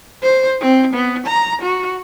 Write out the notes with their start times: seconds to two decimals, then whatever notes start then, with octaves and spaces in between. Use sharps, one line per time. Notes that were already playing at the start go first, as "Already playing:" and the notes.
0.23 C5
0.61 C4
0.93 B3
1.27 A#5
1.62 F#4